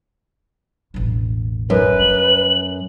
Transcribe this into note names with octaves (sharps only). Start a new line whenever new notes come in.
E1 A1
F#2 B4
G3 F#7